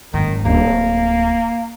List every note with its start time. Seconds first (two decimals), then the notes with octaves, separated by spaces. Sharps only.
0.14 F#1 G#2 D#3
0.45 D1 A#3